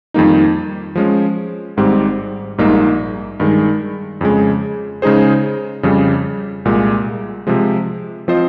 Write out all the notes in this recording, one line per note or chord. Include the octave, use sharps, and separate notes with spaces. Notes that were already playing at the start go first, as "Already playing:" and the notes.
F2 D#3 G3 A#3 D#4
F3 G#3 C#4
G#1 G#2 G3 C4 G4
A#1 G#2 G3 A#3 D#4
G2 D#3 G#3
F2 C#3 G#3
C#3 G#3 D#4 G#4 C5
F2 C#3 G3
C2 A#2 G#3
C3 F3 G#3
F3 C4 F4 C5 D#5